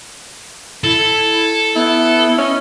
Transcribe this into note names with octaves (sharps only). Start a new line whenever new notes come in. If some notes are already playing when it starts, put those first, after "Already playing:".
E4 A4
B3 E4
C#4 D#5